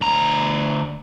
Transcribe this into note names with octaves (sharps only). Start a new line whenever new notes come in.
D2 A#5